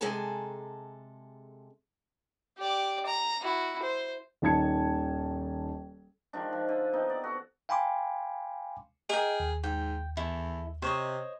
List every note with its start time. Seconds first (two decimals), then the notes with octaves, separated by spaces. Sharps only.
0.01 C3 G#3 G#4 A4 A5 A#5
2.58 G4 D5
3.06 A#5
3.42 E4 F#4
3.83 C5
4.42 D#1 D#3 A5 G#6 C#7
6.33 D#3 F3 G#3 D4
6.53 F3
6.68 D3
6.93 B3 C4 D#4 G5
7.10 D5
7.24 F#4 A4
7.69 F5 G5 G#5 B5 C6 D6
9.09 G#4 A#4 D#5 G5
9.40 D#2
9.64 G#2 G5
10.17 E2 E4 A4
10.82 C3 C5 C#5 D#5